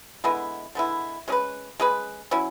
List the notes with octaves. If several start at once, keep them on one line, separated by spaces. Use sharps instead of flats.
D3 G#3 B3 E4
D3 G#3 B3 E4
G#3 C#4 G#4 B4
G#3 C#4 G#4 B4
F#3 C#4 E4